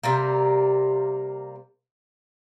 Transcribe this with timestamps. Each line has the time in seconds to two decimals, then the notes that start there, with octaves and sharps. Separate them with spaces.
0.03 C3 G3 A#3